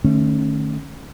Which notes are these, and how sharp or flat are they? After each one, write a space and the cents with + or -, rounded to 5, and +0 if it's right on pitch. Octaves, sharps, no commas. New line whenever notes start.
D#3 -45 A3 +0 C#4 -20